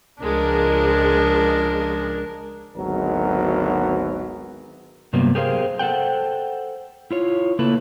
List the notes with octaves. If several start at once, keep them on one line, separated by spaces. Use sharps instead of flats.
C#2 F3 G#3 D4 A#4
G#1 D2 F#3 G#3 B3 A#4
G2 C3 F#3 G3 A#3 B3
G4 G#4 A#4 C5 E5 F5
A4 C5 F#5 G5
E4 F4 C#5
C#3 A3 A#3 E4 A4 B4